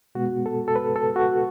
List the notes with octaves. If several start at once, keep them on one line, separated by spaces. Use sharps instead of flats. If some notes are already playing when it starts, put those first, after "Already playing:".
B2 G#3 B3 F#4
A4
A4
B4
A4
F#4